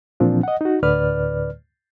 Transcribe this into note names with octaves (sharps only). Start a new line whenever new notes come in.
A#2 E3 F3 C4 D4
D#5 F#5
D#4 F#4
D2 A2 D3 B4 D5 F6